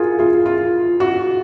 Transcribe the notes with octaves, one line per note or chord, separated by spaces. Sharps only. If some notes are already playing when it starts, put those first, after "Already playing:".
Already playing: F4 F#4 G#4 A#4
F4 G#4
F4
F#4